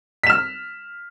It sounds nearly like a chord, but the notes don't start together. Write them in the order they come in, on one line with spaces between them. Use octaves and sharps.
B6 E7 F6